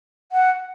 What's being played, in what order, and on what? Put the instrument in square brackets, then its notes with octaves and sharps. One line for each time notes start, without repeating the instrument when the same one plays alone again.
[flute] F#5